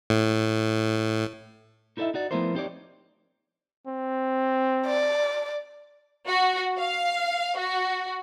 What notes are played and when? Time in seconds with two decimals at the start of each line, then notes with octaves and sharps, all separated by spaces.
0.10 A2
1.97 D#4 E4 A4 C#5 D#5 E5
2.14 D#4 F#4 D5
2.31 F3 A3 B3 E4 A#4 C5
2.55 C4 D#4 G4 A#4 C#5 D5
3.87 C4
4.86 D5
6.27 F#4
6.79 F5
7.58 F#4